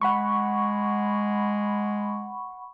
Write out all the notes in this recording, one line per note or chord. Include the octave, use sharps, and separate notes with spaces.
G#3 F#5 B5 C#6